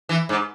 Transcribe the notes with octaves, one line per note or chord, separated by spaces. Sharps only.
E3
G#2